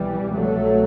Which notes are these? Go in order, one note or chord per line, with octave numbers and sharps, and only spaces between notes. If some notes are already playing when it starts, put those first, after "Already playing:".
Already playing: C2 B2 E3 G3
F#3 A3